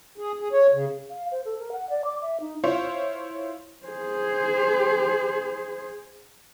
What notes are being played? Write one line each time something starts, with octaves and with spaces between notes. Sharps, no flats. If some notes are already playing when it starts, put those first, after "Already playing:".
G#4
G#4
C#5
C#3
F5
C5
A4
A#4
F#5
D5
D6
E5
D#4
E4 F4 C5 C#5 F5
G#4 C5